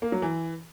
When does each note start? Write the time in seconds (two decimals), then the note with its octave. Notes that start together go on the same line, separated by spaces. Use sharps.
0.02 A#3
0.12 F#3
0.22 E3